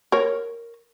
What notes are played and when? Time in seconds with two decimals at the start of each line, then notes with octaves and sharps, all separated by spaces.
0.12 A#4 C#5